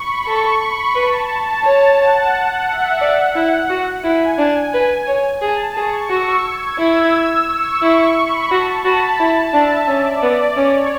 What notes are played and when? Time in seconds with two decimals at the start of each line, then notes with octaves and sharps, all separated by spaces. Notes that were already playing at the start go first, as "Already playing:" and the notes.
Already playing: B5 C#6
0.26 A4 C#6
0.61 B5
0.95 B4 A5
1.30 A5
1.64 C#5
1.98 F#5
2.32 F#5
2.68 E5
3.01 D5 F#5
3.35 E4
3.70 F#4
4.04 E4 G#5
4.38 D4 G#5
4.74 B4
5.08 C#5
5.42 G#4 A5
5.76 G#4 C#6
6.10 F#4 E6
6.44 G#6
6.79 E4 E6
7.48 C#6
7.82 E4
8.16 B5
8.50 F#4 A5
8.85 F#4 B5
9.19 E4 A5
9.54 D4 E5
9.87 C#4 D5
10.23 B3
10.57 C#4 C#5